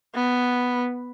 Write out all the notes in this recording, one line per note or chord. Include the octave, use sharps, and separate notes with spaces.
B3